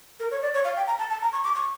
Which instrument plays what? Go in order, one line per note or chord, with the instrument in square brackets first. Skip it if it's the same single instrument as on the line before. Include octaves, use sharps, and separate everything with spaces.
[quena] A#4
C#5
D5
C#5
F5
G5
A#5
A5
A5
A#5
C#6
D6
C#6